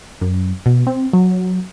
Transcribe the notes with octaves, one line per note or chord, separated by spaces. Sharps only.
F#2
B2
C4
F#3